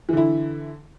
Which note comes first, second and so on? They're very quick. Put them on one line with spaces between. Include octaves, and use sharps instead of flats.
E3 D3 E4